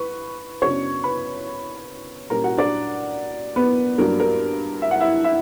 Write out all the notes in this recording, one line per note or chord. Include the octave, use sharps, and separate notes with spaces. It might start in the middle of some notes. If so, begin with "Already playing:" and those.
Already playing: B4 C#6
F#2 C#3 F#3 B3 D4 C#5 C#6
B4 B5
A#2 G3 C#4 A#4 A#5
F#4 F#5
D4 D5
B3 B4
G2 F#3 A#3 D4 A#4
A#4
E5
F#5
E4 E5
E4 E5